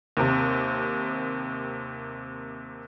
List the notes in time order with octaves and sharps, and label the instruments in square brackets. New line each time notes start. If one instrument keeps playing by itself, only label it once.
[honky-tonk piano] D#2 C3